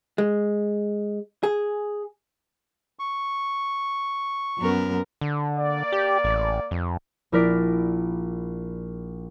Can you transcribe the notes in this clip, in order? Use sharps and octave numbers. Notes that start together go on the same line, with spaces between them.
G#3
G#4
C#6
F#2 B3 A#4
D3
A#3 D5
G4
A1
F2
A#1 E4 A#4 D5 B6